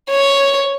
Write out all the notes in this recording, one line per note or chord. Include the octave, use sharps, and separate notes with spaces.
C#5